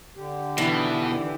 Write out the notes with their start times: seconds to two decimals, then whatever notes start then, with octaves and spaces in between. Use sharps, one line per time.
0.16 D3 G4
0.58 B2 D#3 E3 D4